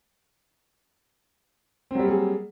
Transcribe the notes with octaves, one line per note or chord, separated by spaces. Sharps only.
F#3 G3 A#3 C4 G#4